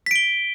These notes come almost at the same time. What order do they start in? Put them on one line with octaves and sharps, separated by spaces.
B6 D7 G7